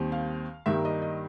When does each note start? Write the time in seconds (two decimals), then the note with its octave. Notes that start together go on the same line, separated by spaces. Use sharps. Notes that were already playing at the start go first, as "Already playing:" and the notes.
Already playing: D#2 D#3 G3 C4
0.12 F5
0.66 G2 D#3 G3 A#3 E5
0.85 D#5
1.02 D#5